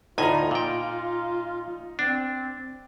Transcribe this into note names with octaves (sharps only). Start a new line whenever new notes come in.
D2 A2 D#4 F4 G#5 A#5
A#2 G5
C4 D4